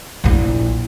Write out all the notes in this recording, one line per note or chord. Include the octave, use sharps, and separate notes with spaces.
A#1 E4